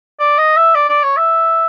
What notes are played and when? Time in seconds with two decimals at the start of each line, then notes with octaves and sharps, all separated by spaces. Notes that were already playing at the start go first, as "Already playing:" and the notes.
0.20 D5
0.38 D#5
0.57 E5
0.75 D5
0.89 D5
1.03 C#5
1.17 E5